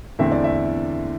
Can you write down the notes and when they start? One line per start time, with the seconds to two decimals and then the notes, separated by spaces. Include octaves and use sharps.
0.19 E2 D3 A3 C4 E5
0.32 D5
0.44 E5